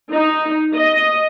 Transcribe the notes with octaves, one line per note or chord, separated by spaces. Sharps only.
D#4
D#5